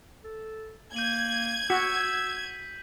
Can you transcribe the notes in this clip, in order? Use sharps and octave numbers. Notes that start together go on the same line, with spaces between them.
A4
A#3 G6 G#6 D#7 F#7
F#4 E6 B6